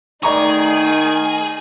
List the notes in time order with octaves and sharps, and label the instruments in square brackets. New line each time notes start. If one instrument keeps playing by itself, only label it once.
[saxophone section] D#3 [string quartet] A3 D#4 [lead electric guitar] G#4 [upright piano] D5 A#5 C#6